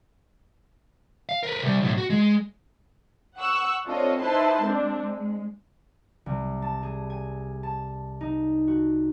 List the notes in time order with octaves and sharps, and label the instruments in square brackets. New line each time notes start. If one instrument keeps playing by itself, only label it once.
[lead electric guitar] F5
A#4 B4
C3 G3
B1 A2
F#4
G#3
[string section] F#5 C#6 E6 F#6
C4 D4 F4 A4 C#5 D#5
D#4 E4 B4 C5 A5 C6
G#3 C4 D4
G#3
[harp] C2
A5
G#4
G#5
A5
D#4
F#4